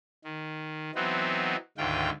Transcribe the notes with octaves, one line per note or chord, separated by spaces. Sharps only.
D#3
E3 F#3 B3 C4 D#4
D2 G#2 D#3 F4 G5